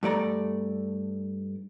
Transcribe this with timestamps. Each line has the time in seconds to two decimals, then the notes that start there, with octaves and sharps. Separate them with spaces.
0.03 G2 A3 D5 A#5